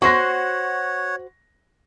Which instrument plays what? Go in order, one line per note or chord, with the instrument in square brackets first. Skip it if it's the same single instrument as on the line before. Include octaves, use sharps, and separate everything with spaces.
[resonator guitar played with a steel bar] F#4 C5 [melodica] C#5 F#5 [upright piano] C#6 A#6